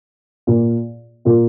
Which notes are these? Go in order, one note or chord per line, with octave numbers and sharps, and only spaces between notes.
A#2 A#3 F4
A#2 A#3 F4